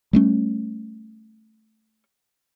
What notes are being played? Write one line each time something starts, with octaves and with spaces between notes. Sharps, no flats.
G3 A3 C#4